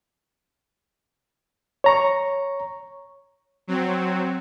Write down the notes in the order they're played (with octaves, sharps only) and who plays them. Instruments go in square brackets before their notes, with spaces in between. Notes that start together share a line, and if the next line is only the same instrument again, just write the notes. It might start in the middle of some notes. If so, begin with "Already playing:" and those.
[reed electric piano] C#5 A#5 C#6
[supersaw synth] F#3 C4